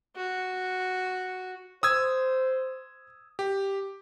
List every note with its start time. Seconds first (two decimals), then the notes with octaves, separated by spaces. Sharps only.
0.16 F#4
1.83 C5 D#6 E6 G#6
3.39 G4